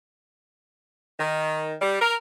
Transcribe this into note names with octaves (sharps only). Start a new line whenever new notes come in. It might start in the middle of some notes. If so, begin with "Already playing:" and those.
D#3
G3
A#4